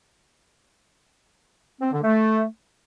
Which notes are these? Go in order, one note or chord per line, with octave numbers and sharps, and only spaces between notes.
C4
D3
A3